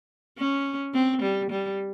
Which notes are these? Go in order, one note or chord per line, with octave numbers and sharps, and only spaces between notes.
C#4
C4
G3
G3